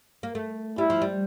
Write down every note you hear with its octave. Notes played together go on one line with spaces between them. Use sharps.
A#3
A3
G3 E4
F3
G3